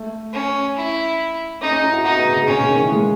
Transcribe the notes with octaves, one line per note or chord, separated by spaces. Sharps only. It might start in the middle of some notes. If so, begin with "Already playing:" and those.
Already playing: A3
C#4
E4
C#4 D#4
C#4
E4
F#4
D#4 F#4
B3
C#3
C#3
B2 C#4
C#3
D#3
E3
G#3